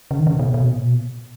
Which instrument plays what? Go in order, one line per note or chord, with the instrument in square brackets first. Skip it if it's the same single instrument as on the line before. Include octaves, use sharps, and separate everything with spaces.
[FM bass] C#3
D#3
C#3
B2
B2
A#2
B2